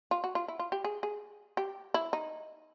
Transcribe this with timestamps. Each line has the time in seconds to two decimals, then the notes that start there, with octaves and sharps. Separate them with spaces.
0.11 F4
0.24 F#4
0.35 F4
0.48 E4
0.59 F4
0.72 G4
0.84 G#4
1.03 G#4
1.57 G4
1.94 E4
2.13 D#4